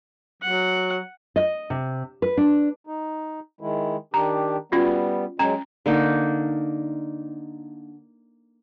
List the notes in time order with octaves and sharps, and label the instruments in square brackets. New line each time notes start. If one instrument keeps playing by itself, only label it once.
[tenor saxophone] F#3 [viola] F#5
[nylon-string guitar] D#5
C3
B4
D4
[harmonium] D#4
D#3 G#3 E4
[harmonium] D#3 D4 G4 [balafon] A#5
[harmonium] G3 B3 [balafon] C#4 F4 F#4
[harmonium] F#3 G#3 [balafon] C#4 A#5
[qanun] D3 A#3 D#4